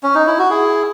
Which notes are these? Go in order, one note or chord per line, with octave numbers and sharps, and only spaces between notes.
C#4
D#4
E4
F#4
E4 G#4